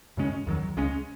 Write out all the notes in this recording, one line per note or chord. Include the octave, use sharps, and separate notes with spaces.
F#2 C#3 G#3 C#4
E2 D#3 F#3
C#2 C#3 G#3 C#4